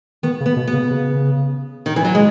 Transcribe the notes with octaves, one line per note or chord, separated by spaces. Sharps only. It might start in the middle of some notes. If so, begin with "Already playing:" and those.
D#3 B3
C#3
B3
B2
B3
C#3
C#3
D#3
E3
F#3
G#3